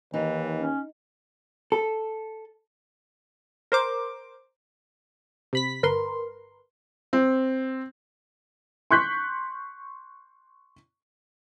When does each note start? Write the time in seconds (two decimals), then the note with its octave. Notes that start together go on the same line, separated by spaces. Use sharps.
0.14 D#2 E3 D#4
0.58 C#4
1.72 A4
3.72 A#4 C5 D6
5.53 C3 B5 B6
5.83 G1 A#4 B4 C6
7.13 C4
8.91 C6 C#6 F#6 G6 B6